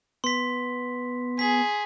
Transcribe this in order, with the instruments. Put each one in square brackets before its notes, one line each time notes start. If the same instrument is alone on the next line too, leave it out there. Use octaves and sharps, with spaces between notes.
[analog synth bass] B3 [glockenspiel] C6 B6
[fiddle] G#4 [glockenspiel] B6